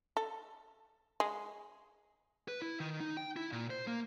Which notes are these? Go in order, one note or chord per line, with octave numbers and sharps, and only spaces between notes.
A4
G#3
B4
E4
D#3
D#4
G5
E4
A#2
C5
A#3